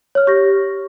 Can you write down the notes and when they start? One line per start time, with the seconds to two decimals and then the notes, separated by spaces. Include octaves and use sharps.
0.15 C#5 F6
0.27 G4 C#6 A#6